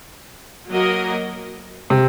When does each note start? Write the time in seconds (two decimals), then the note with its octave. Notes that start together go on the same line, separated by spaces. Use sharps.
0.70 F#3 A#3 F#4 A#4 D#5
1.90 C3